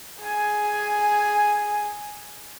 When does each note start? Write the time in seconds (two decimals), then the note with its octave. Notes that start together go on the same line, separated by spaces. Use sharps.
0.22 G#4 G#5